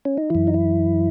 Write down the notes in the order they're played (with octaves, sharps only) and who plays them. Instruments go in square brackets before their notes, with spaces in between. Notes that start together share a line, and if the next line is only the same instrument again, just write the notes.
[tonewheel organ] C#4
D#4
F#2 E3 E4
D#4
E4